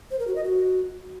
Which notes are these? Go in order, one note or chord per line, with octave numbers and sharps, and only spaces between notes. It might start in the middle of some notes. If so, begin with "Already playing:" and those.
C5
A#4
F#4
D#5
F#4